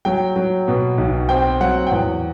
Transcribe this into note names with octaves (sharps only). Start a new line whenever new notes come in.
F#3 G5
F#3
B2
B1
C4 G5
F#3 F#5
G5
E2 F#5